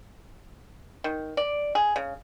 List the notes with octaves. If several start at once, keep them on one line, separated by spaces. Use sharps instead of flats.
D#3
D5
G#4
C#3